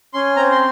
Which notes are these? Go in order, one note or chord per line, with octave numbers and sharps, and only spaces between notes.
C#4 C6
C4 A#5
C6